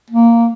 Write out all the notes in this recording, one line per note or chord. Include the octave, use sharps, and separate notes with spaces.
A#3